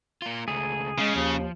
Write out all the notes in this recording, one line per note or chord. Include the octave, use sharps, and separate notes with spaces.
A#3 F4
C#2 A3 G#4
C#3 G#3
D#2 F3